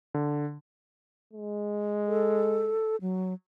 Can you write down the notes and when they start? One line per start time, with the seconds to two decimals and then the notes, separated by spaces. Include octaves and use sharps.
0.14 D3
1.33 G#3
2.07 A4
3.01 F#3